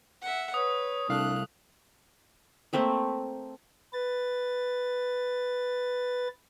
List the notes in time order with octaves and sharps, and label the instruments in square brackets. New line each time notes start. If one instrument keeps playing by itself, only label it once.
[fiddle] E5 F#5
[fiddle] B4 [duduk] C#5 [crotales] D#6
[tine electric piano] C2 F5 [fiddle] A3 F#6 [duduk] D4
[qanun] A3 A#3 C4 E5
[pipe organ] B4 A6